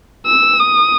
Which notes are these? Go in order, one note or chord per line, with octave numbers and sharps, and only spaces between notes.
E6
D#6